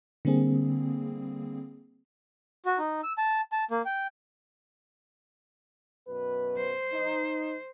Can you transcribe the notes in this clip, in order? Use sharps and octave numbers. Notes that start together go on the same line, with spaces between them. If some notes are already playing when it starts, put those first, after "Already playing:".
D3 G3 A#3 C4 G#4
F#4
D#4
E6
A5
A5
A#3
G5
F#2 B2 B4
C5
D#4